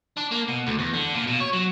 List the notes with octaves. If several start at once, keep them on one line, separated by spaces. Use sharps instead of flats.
D4
A#3
B2
D2
E2
D3
A#2
B2
C#5
F#3